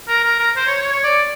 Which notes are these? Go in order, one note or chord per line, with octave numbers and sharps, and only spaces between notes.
A#4
A#4
A#4
C5
C#5
C#5
C#5
D5